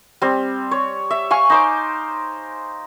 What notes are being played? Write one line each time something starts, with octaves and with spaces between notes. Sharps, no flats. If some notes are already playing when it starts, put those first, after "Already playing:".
G3 C4
C#5
E5
F5 G#5 C#6
D#4 C5 D6